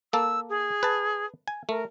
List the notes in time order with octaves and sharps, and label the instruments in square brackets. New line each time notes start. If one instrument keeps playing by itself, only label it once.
[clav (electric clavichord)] A#3 A4 [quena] E6
[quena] G#4
[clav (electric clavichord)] B4 A5
G#5
[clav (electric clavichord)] A3 [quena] A#4